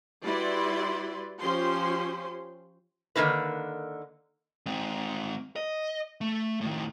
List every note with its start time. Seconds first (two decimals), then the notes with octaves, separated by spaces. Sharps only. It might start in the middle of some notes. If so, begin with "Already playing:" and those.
0.25 G3 E4 F#4 B4 D5 C6
1.41 F3 C#4 G4 C5 C6
3.16 D3 D#3 A#3 E4 B4
4.66 G#3 C4
5.56 D#5
6.21 A3
6.61 A2 D#3